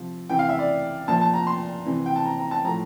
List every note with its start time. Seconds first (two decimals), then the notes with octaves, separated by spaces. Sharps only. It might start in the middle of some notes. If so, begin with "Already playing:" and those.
Already playing: C3 F3
0.30 C3 E3 G5
0.39 F5
0.49 E5
0.59 D5
1.08 A#2 F3 A5
1.21 A5
1.34 A#5
1.47 C6
1.86 C3 E3
2.06 G5
2.16 A5
2.25 A#5
2.39 A#5
2.51 A5
2.65 A2 F3 A#5